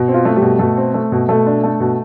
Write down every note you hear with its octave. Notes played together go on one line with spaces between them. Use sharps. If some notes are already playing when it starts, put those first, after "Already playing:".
Already playing: B2
C4
F4
A3
G3 G4
B2
B2 A3 A4
C4
A3
B2
B2 A3 A4
D4
A3
B2